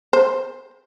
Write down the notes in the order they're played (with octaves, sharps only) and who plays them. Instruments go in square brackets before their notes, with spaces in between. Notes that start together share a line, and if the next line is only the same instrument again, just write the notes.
[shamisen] C5